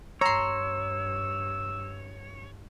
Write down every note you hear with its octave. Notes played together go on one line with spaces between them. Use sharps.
G2 C#5 A#5 C6 E6